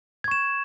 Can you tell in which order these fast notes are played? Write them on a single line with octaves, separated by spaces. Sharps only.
G#6 C#6 E7